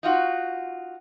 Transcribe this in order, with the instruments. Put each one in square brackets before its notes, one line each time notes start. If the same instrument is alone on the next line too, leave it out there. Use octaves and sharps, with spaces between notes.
[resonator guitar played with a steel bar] D#4 F4 F#4